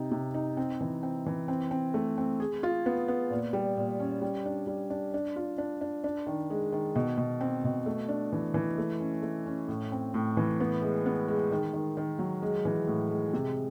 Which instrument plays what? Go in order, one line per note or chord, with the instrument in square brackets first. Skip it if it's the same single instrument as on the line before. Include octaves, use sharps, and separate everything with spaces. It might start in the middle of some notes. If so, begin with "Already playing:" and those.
Already playing: [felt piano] C3 D#4
C3
D#4
C4
E3
C4
E3
C4
C4
A3
C4
G#4
F4
B3
B3
A#2
G3
A#2
C#4
G3
D4
G3
D4
D4
F4
D4
D4
D4
D#3
G#3
D#3
B2
B2
C4
B2
A3
D4
E3
E3
A3
C#4
A3
C#4
A2
C4
A2
E3
B3
G#3
B3
G#3
D#3
D#3
D#3
F#3
G#3
E3
A2
G#3
C3